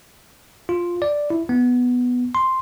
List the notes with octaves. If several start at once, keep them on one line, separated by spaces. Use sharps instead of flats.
F4
D5
E4
B3
C6